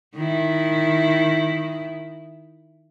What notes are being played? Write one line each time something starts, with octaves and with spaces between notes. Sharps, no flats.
D#3 E4